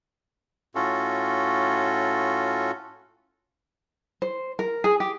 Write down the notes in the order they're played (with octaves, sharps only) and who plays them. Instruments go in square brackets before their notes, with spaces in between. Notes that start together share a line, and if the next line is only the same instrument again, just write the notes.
[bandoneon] A2 C#4 F4 F#4 A4
[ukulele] C5
A#4
G#4
G4